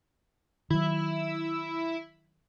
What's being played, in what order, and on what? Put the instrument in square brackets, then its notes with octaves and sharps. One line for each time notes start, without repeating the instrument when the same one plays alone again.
[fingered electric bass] D#3 F#3 [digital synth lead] E4